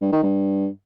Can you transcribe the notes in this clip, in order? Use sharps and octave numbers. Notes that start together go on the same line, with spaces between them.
G2
D#3
G2